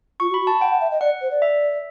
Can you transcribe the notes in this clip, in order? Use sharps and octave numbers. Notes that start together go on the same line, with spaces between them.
F4 C#6
F#4
B5
F#4
A5
F#5 G5
F#5
E5
D#5
D5 F#5
C5
D5
E5